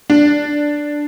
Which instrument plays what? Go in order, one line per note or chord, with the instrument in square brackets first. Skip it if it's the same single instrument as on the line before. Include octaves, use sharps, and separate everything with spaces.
[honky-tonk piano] D4